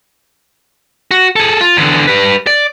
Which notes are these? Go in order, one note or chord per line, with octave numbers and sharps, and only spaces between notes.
F#4
G#4 A4
F4
E2 D3
G3 B4
D5